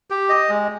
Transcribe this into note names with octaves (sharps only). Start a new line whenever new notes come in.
G4
D#5
G#3